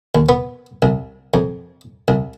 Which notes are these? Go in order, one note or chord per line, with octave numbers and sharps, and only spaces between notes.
D#2
B3
C2
F2
C2